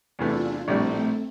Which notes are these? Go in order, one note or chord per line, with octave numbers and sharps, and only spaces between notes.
E2 C3 E3 A3 D4 F4
A#1 A2 G3 A3 C4 D4